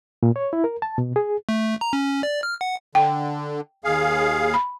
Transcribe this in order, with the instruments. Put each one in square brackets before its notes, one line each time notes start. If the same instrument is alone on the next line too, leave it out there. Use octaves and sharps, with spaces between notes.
[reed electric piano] A#2
C#5
E4
A#4
A5
B2
G#4
[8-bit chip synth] A3
A#5
C#4
D5
F6
F#5
[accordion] D3 [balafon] G5
[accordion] D#2 G#4 F5
[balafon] B5